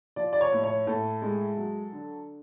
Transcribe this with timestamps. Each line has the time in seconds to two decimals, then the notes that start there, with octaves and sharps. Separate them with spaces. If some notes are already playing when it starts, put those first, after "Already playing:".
0.16 F3 D5
0.33 D5
0.41 C#5
0.53 A2
0.64 C#5
0.87 A2 A4
1.22 G#3
1.57 F#3
1.92 D3